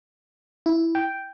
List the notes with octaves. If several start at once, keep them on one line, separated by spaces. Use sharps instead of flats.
E4
G5